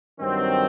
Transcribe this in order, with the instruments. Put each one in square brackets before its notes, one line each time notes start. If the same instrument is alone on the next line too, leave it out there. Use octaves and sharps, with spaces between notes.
[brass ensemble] G2 D#3 F#3 C4